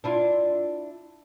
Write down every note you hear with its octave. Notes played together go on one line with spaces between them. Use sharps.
D4 E4 F4